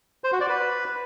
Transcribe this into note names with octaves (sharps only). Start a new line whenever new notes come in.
C5
F#4
D5
B4